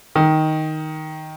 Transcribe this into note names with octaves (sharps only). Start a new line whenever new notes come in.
D#3